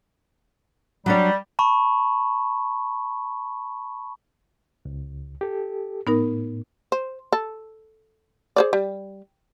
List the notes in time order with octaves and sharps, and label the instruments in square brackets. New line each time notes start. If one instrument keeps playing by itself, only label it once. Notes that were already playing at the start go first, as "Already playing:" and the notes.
[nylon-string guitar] F#3 D4 C#5 [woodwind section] G3
[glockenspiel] A5 B5 C#6
[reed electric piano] C#2
G4 A4
[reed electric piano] A2 [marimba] B3 D#4 A#4
[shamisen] C5
A4
G#4 C5 D5
G3